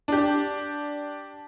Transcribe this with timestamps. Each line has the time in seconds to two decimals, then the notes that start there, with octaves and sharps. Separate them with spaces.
0.08 D4 G4